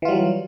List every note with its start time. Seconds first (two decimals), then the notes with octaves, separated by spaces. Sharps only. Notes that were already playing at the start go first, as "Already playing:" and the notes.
0.02 E3
0.05 F4
0.08 G3
0.11 F#3